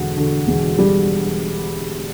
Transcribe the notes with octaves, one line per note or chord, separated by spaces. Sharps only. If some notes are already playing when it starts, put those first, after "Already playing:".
Already playing: E1 D3 F#4
D3
E1
G3